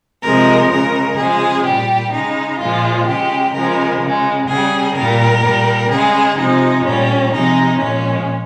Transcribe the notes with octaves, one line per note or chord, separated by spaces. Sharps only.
C3 F3 G#3 A#4
C#3 G#3 A#4
C#3 F3 G#3 G#4
A#2 G3 G4
C#3 G#3 D#4
A#2 F3 G#3 F4
C#3 G#3 G4
C#3 F3 G#3 A#4
C#3 G#3
C#3 G3 G#4
A#2 G3 A#4
A#2 G3
C#3 G#3 G#4
C3 F3 G#3 D#4
A#2 G3 C#4
C3 F3 G#3 D#4
A#2 F3 G#3 C#4